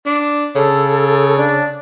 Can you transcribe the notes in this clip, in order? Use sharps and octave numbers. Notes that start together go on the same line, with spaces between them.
D4
C#3 A4
D4